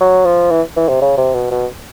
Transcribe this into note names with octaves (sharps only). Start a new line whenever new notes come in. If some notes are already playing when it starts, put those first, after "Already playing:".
F#3
F3
E3
E3
C3
C#3
C3
B2
B2